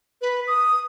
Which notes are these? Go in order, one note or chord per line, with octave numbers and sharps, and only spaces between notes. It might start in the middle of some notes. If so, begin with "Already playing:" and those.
B4
D#6